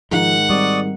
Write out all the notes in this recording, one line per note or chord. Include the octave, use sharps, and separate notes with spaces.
G#2 D#3 F3 G#3 F#5
G3 C4 D5 C#6 D#6